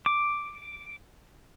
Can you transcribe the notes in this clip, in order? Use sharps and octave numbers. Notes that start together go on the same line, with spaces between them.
D6